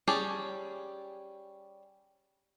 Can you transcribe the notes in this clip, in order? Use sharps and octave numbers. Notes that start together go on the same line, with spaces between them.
G3 C#4 G4 G#4 A5